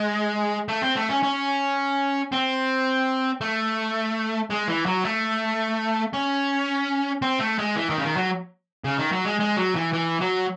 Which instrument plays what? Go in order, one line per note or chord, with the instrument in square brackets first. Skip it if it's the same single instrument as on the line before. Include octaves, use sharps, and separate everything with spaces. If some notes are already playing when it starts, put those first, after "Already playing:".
Already playing: [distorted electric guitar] G#3
A3
C4
A3
C#4
C#4
C4
A3
G#3
E3
F#3
A3
C#4
C4
A3
G#3
E3
D#3
C#3
D#3
F#3
C#3
D#3
F#3
G#3
G#3
F#3
E3
E3
F#3